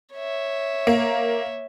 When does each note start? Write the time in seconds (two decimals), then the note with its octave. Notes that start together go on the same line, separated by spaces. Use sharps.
0.14 C#5 E5
0.87 A#3